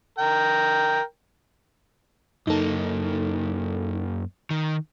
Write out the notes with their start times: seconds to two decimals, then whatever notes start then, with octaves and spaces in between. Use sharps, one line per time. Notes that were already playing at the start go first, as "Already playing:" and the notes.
0.18 A#4 G5
2.47 F#2 A#3 D#4 A4
4.50 D#3